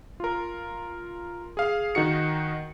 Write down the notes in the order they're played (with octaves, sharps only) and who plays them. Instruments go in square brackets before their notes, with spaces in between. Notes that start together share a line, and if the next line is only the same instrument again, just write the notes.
[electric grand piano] F4 A#4
G#4 F5
D#3 D#4 F#4 C#7